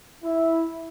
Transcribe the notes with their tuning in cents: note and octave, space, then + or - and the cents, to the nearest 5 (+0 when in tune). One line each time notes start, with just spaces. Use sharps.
E4 -5